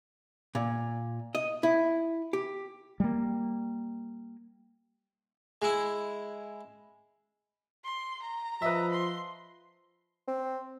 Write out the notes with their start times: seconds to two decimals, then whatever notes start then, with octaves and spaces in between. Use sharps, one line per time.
0.55 A#2
1.35 D#5
1.63 E4
2.33 G4
3.00 G3 A#3
5.62 G#3 E4
7.84 C6
8.22 A#5
8.62 F3 B4 D#5 E5
8.91 C6
10.28 C4